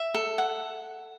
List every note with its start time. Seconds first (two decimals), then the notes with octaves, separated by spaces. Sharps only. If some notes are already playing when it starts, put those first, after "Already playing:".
Already playing: E5
0.14 A4
0.38 F#5